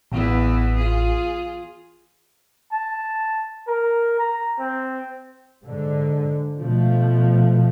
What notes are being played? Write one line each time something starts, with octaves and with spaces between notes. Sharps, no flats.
A1 E2 B3 E4
F4 G#4
A5
A#4
A#5
C4
G#2 D3
B2 F3 A3